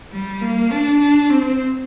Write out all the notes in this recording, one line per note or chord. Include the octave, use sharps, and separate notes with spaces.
G3
A#3
D4
D4
C4